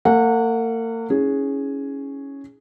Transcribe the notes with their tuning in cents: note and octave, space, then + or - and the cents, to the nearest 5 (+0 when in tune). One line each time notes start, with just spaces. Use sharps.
A#3 -40 F#5 -20
C#4 +0 E4 -40 G#4 +0